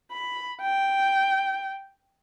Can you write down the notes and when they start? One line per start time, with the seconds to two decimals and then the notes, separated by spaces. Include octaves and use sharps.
0.11 B5
0.61 G5